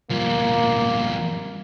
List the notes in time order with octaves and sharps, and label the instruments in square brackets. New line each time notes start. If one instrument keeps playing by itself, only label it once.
[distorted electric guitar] G2 F3 [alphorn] A#3